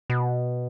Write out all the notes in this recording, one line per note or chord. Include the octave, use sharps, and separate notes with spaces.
B2